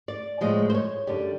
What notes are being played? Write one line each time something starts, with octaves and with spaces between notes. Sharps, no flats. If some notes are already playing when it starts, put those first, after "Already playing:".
D5
A2 F3 G#3 D#5
C5
C#5
F#2 D3 G3 D5